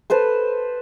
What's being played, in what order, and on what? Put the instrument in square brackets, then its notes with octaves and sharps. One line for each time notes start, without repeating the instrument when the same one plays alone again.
[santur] A4 B4 C5 C6